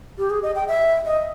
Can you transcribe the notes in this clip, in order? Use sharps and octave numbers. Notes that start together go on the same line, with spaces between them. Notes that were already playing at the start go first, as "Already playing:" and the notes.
G4
G#4
D#5
G5
E5
D#5